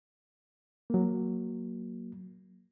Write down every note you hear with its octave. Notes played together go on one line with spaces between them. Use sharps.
F#3 A#3